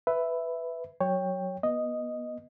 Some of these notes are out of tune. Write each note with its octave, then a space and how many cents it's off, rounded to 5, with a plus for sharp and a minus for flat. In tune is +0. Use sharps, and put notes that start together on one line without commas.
B4 +10 E5 +0
F#3 +0 C#5 +0 G5 +10
B3 -30 D#5 +0